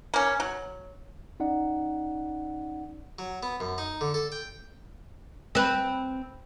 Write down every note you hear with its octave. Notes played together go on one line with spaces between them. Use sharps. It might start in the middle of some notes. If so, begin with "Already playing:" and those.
A#3 C#4
F#3
C#4 D#4 D5 F#5
F#3
B3
F#2
D#4
D3
A4
G5
C4 B4